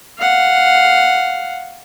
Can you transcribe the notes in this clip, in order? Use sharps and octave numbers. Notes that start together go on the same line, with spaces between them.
F5 F#5